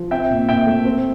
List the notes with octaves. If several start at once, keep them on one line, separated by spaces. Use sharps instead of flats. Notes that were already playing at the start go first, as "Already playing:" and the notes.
Already playing: F3
C4 E5 G5
A#2
A#2 E5 G5
A3
C4